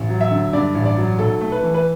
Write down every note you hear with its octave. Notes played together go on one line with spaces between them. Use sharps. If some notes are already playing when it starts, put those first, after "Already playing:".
Already playing: A1
F#3
E5
D3
G2 D5
A1
D5
F#3
B1 A4
A3
B4
E3
B4